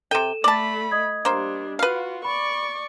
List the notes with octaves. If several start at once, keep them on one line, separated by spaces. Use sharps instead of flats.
C3 A4 G5 D#7 E7
A3 D5 A5 B5
D#5 D#6 G#6
G3 A#3 D4 C5
F4 F#4 B4 F5
D5 B5 C#6